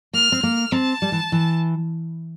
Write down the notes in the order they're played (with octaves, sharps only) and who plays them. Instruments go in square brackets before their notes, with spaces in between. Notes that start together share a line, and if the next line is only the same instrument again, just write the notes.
[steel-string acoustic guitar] A#3 [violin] F6
[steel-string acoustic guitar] C4
[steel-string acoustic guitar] A#3 [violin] F6
[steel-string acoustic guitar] C4 [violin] A5
[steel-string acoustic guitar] G3
E3
E3